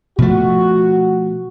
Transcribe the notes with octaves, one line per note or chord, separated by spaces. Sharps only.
B2 F3 A3 F#4